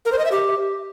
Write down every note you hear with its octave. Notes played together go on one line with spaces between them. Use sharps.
A#4
C5
D#5
E5
G4